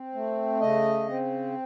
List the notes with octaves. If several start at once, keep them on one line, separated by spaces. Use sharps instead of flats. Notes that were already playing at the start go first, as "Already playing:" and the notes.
Already playing: C4
A3
C#3 D#5
C4